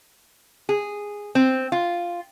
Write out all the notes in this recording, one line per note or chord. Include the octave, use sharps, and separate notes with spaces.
G#4
C4
F4